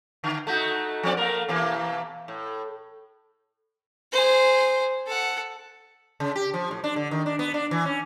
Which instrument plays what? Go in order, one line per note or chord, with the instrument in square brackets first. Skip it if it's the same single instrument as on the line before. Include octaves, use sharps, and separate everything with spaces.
[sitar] D3
A3 D#4 F#4
F3 C4 D5
A3 A#3 A#4
B2 E3 A#3
A2
[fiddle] G#4 C5
A4 F#5
[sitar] C#3
G4
F3
A2
D4
D3
D#3
D4
B3
D4
E3
C#4